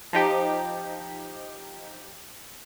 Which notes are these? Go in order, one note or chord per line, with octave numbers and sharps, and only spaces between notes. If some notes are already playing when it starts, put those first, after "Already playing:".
F3 D#4 G4